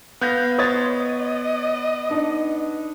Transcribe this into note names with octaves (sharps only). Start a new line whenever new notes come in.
B3 F5 F#6 G6 A#6
C5 C#5 D#6 G#6 A6
D#5
D4 D#4